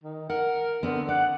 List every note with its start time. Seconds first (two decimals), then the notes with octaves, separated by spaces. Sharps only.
0.03 D#3
0.30 A#4 F#5
0.83 D3 B3 C4
1.09 D5 F#5